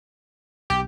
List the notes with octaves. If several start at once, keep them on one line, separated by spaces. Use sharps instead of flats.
B1 G4